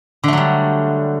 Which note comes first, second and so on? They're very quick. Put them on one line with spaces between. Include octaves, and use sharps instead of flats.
D3 A3 F#3 G3